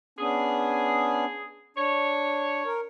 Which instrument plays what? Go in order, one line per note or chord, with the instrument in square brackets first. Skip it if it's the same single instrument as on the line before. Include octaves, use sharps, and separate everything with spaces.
[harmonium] B3 C#4 D4 [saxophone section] G#4
[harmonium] D4 [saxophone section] C#5
[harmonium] A#4